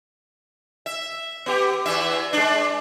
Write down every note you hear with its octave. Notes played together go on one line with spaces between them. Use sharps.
E5
B3 G4
E2 E3 E5
G#3 D4